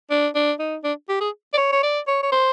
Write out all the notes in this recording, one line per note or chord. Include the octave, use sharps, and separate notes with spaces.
D4
D4
D#4
D4
G4
G#4
D5
C#5
C#5
D5
C#5
C#5
C5